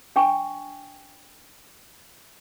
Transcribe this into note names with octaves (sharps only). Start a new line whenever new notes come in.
D4 G5 G#5 C#6